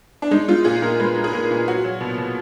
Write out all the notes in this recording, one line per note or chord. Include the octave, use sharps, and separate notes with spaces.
D4
G#3 D#4
G#3 F4
A#2 G#4
A#2 A#4
G#3 B4
G#3
G#4
A#2 A#4
A#2
F#3 F#4
F#3
B2
B2